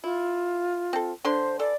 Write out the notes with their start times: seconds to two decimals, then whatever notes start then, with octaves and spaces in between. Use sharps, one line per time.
0.04 E4 F4
0.93 C4 A4
1.25 D3 D4 C5 C6
1.59 E3 A4 D5